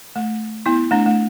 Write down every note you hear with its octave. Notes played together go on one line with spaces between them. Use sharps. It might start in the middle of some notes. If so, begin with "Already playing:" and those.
A3
B3 E4
A3 D4
A3